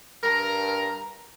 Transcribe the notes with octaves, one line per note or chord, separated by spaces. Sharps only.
G2 A#4 A#5